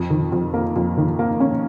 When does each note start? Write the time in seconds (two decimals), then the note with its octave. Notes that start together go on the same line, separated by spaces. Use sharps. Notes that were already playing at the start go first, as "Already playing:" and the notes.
Already playing: F2
0.10 D#3
0.32 F2
0.54 A#3
0.76 F2
0.97 D#3
1.19 A#3
1.40 C#4